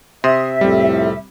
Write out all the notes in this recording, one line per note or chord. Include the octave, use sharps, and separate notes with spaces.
C3 E5 C6 D#6
C2 F2 A2 G3 C4